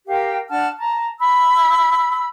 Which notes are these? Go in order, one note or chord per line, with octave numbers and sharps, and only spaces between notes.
G4 A#4 F5 G5
D4 F#5 A5 F6
A5 A#5
B5 E6